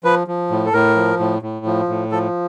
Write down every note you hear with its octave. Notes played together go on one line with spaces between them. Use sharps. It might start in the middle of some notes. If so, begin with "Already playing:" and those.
F3 B4
F3
A2
A4
A2 A#4
F3
A2
A2
F3
A2
F3 A4